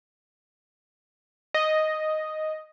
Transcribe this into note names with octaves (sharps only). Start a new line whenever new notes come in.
D#5